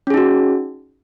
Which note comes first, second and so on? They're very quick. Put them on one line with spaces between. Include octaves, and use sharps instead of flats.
C#4 G#4 D#4 F#4